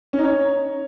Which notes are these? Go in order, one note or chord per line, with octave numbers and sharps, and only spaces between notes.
C#4
D#4
C#5